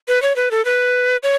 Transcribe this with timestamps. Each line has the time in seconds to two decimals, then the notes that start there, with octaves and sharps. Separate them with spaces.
0.08 B4
0.22 C#5
0.36 B4
0.51 A4
0.65 B4
1.23 C#5